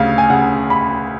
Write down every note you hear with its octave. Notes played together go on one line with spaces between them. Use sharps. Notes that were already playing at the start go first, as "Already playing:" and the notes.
Already playing: D2 C#3 F5
G#5
C#3 F#5
B5